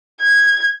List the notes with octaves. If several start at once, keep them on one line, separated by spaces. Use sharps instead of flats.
G#6